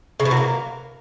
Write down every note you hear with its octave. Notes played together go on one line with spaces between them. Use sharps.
C#3
B2
F#3
A#3